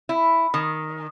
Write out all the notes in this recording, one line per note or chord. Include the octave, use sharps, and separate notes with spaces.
E4
D#3